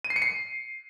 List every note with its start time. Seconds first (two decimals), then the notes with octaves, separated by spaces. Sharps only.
0.04 D#7
0.10 C7
0.16 C#7
0.22 C7